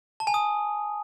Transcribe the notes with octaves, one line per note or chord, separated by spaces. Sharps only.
A5
G#5
D#6